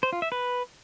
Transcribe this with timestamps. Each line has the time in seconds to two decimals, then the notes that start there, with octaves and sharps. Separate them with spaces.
0.03 C5
0.13 F4
0.22 E5
0.32 B4